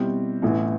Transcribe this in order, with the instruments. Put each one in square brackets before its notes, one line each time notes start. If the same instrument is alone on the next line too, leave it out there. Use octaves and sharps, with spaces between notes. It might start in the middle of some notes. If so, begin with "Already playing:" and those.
Already playing: [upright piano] B2 G3 C4 E4 G4
A1 A2 E3 B3 E4